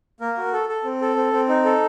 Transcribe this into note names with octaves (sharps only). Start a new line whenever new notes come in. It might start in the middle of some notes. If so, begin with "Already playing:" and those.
A#3 A#4
F#4
A4
A4
C4
A4
C4
C4
D#4
A4